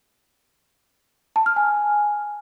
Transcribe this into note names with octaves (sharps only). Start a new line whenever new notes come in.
A5
F6
G#5